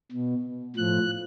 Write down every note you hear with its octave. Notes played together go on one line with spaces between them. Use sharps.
B2
A2 F3 F#6